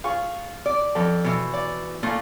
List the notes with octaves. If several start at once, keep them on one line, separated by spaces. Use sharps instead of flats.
F4 G#4 C#6
D5
F2 A4
B2 E3
D5
A#2 A3 F4